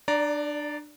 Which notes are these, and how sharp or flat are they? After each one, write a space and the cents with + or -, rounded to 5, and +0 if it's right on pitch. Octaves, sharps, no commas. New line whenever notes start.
D4 +25 D5 -10 A#5 +0